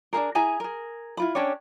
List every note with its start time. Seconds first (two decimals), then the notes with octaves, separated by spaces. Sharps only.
0.13 D4 D#4 G#4 A#4
0.35 E4 G#4 G#5 A#5
0.60 G#4 A#4
1.17 E4 F4 B5
1.35 C#4 D4 G4 C#5